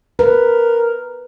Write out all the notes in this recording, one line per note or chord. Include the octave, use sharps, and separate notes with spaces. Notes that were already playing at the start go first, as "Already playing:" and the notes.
A#4 B4